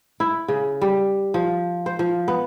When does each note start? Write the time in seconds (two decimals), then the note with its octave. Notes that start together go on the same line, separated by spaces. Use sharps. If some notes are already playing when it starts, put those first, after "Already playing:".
0.20 E4
0.48 C#3
0.81 G3
1.34 F3
1.86 C5
1.99 F3
2.28 B3